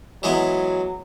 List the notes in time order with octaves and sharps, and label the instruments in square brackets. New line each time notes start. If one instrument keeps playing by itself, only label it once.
[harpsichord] E3 G#3 B3 [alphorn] F#3